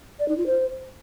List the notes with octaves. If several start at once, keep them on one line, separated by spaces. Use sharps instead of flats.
D5
D#4
F4
C5